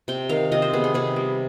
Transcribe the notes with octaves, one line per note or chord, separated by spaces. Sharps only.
C3 G5
D#3 F5
C3 D#5
C5
B3 G#4
G#4
C3 G#4
G3